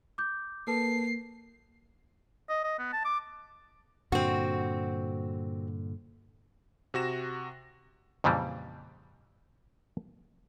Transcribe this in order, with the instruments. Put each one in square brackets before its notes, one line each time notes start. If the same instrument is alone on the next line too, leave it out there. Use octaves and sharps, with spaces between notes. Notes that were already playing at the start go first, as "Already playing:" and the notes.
[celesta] D6 G6
[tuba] A#3 [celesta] A4 B4 A5 [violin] C7
[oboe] D#5
D#5
B3
A5
D6
[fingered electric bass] G2 A#2 D3 [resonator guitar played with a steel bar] C4 F#4
[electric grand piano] C3 F#4 A#6 E7
[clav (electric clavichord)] F2 A#2 C#3 E3 G3